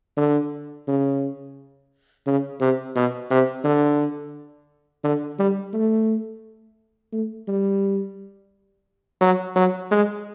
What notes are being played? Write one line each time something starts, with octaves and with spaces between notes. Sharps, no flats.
D3
C#3
C#3
C3
B2
C3
D3
D3
G3
A3
A3
G3
F#3
F#3
G#3